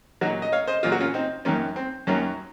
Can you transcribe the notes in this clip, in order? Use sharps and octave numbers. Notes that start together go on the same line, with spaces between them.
A#2 F#3 D#4 F#4
D#5
C#5 F5
C5 D#5
A#2 F#3 F4
F#4
C#4 F4
C4 D#4
F#2 D#3 F#3 A#3 C#4
C4
F#2 D#3 F#3 A#3 C#4